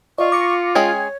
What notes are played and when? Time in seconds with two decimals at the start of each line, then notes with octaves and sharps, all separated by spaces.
0.18 F4 D5 D#5 C#6
0.32 D6 A#6 C#7
0.75 G#3 C#4 G#4 C#5 G5 G#6